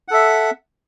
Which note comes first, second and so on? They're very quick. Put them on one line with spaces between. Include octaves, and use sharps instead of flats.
F#5 A4 E5